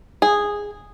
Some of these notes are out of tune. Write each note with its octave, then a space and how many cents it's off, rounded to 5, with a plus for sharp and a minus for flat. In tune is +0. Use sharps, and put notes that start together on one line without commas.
G#4 -10